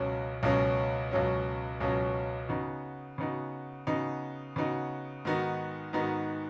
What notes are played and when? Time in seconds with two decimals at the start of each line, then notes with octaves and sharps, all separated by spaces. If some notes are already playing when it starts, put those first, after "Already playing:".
Already playing: C#2 B2 F#3 C#4
0.43 C#2 B2 F#3 C#4
1.11 C#2 B2 F#3 C#4
1.80 C#2 B2 F#3 C#4
2.49 C#3 B3 D#4 F#4
3.18 C#3 B3 D#4 F#4
3.87 C#3 B3 D#4 F#4
4.56 C#3 B3 D#4 F#4
5.25 G#2 D#3 B3 D#4 F#4
5.93 G#2 D#3 B3 D#4 F#4